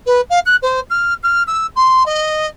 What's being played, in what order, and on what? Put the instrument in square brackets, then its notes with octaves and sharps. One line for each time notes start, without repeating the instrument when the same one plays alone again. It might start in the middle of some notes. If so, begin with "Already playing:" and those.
[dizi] B4
F5
F#6
C5
F6
F6
E6
C6
D#5